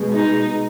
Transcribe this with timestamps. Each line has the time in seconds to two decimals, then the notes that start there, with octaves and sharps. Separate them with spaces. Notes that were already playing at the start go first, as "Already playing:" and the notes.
Already playing: B2 G#3
0.11 D#4